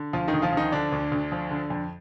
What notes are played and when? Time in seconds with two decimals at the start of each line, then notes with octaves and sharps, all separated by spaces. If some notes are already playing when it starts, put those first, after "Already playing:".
Already playing: D3
0.13 D2 F3 F4
0.28 D#3 D#4
0.33 D2
0.42 F3 F4
0.53 D#3 F3 D#4
0.72 D3 D4
0.92 D2
1.12 D2
1.32 F3
1.51 D3
1.70 F2